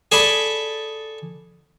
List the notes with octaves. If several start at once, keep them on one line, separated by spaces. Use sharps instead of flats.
G#4 A4 D5 A5 B5